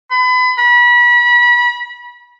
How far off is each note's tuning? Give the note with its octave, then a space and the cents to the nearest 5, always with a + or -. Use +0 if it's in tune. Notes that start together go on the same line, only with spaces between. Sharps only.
B5 +30
B5 -30